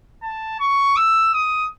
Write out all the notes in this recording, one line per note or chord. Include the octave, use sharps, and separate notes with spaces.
A5
C#6
E6
D#6